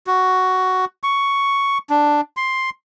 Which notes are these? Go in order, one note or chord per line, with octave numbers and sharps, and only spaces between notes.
F#4
C#6
D4
C6